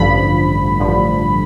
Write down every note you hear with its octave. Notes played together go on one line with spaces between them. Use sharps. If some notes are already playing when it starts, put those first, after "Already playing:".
Already playing: A1 G2 D3 F3 B5
A1 G2 D3 F3